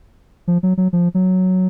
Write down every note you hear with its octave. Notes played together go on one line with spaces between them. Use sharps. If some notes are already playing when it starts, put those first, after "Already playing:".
F3
F#3
F#3
F3
F#3